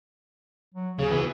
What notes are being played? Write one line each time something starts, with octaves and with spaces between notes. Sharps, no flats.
F#3
D#2 C#3 G#4
D2 E3 B3